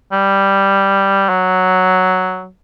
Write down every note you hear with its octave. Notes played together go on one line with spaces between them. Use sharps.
G3
F#3